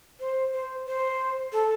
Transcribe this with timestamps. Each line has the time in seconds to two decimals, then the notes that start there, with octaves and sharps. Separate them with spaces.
0.20 C5
0.53 C5
0.86 C5
1.52 A4